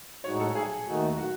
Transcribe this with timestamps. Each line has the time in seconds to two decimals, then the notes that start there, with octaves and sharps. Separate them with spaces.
0.24 A2 G#3 D#4 F#4 C#5
0.40 A4
0.55 G#4
0.87 D#2 D#3 A3 D#4 F#4
1.17 F#4